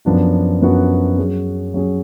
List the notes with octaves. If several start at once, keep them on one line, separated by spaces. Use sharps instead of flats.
F#2 F3 B3 D4 F#4
F#2 F3 B3 D4 F#4
F#3 C#4 G#4
F#3 C#4 G#4